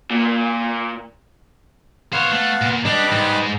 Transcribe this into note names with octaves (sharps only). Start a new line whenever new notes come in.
A#2
B3 C5 C#5 F5 F#5
A3
A#2
G3 D4 B4 D#5 D6
G#2